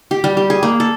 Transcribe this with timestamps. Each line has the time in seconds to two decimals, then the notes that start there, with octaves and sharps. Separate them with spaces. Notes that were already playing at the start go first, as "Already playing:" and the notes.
0.11 G4
0.24 G3
0.37 G4
0.50 G#4
0.63 A#3
0.80 A4